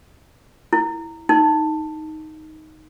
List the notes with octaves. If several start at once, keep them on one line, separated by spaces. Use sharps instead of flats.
E4
D#4